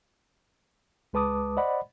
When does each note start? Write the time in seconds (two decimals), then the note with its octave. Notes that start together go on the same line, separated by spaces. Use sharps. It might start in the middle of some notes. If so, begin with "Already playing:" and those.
1.13 C#2 G#3 B4 A5 D6 D#6
1.57 C5 D5 D#5 F#5 B5